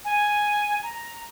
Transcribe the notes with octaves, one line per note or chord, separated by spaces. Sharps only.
G#5
A#5